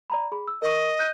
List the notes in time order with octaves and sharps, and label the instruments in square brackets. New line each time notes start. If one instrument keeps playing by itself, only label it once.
[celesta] D5 A#5 B5
G#4 B5
E6
[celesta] A#4 C#6 [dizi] D#5
[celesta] F#6 G6 D#7